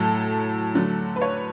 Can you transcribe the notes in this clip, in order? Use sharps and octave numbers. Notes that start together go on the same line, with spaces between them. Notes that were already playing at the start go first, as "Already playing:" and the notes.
Already playing: A2 F#3 A3 A4
D3 F#3 A3
B4
C#5